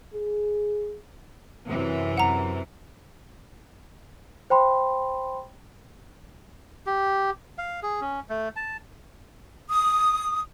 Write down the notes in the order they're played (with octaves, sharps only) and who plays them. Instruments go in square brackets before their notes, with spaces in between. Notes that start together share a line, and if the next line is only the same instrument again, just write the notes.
[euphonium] G#4
[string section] F#2 C3 E3
[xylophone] F#5 A#5
[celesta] C5 G5 B5 C6
[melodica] G4
F5
G#4
C#4
A3
A5
[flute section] D#6